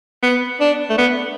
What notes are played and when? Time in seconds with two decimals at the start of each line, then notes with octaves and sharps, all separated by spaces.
0.23 B3
0.60 D4
0.90 A3
0.98 B3